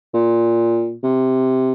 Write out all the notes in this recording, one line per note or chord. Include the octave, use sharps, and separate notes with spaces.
A#2
C3